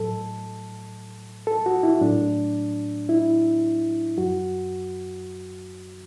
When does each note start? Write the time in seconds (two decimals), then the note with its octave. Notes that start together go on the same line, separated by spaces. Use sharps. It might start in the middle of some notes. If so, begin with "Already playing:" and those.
Already playing: A2 F#3 A4
1.47 A4
1.66 F#4
1.83 E4
2.01 A2 F#3 D4
3.09 E4
4.17 F#2 F#3 F#4